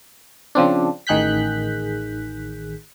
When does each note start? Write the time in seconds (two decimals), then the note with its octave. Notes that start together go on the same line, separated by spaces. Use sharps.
0.55 C#3 F3 C4 D4
1.07 A1 D#3 G#4 F#6 G6 B6